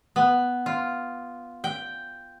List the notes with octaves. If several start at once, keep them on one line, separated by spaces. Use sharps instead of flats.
B3
F4
G5